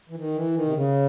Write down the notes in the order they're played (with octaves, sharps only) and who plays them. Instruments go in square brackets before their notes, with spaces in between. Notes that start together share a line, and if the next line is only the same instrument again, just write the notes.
[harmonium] E3
D#3
E3
D#3
C3
C#3